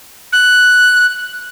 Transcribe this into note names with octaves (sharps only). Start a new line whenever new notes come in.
F#6